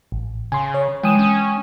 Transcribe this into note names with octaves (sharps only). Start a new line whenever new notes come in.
A1
C#3 G#5 C6
C#5
E3 G#3 G5 G#5 D#6 D#7 E7
C#4